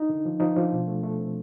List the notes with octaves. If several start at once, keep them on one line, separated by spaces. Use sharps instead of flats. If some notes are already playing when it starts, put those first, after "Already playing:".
Already playing: D#4
D3
F3
F3 D#4
F3 D4
B2
A3
A3
C4